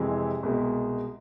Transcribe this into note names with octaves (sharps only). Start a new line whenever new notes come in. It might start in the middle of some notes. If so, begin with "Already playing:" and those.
Already playing: F2 C3 E3 G#3
C2 B2 G#3